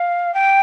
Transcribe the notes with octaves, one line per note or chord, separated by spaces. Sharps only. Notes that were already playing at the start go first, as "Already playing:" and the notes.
Already playing: F5
G5